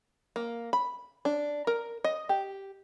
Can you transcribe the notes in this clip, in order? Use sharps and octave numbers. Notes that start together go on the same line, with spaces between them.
A#3
B5
D4
A#4
D#5
G4